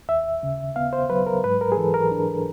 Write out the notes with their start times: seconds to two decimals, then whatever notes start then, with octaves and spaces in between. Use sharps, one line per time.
0.09 D#2 E5
0.43 C#3
0.76 B3 F5
0.93 C5
1.10 F#3 B4
1.27 A#4
1.44 G#2 B4
1.61 A#4
1.72 G#4
1.77 E3 A4
1.94 A#4
2.11 D4